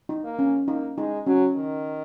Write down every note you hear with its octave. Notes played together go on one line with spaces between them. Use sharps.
D#4
A#3
C#4
A#3 D#4
G#3 D#4
F#3 C#4
D#3